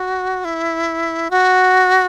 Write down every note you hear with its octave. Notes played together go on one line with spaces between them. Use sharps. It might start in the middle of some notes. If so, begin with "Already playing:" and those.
Already playing: F#4
E4
F#4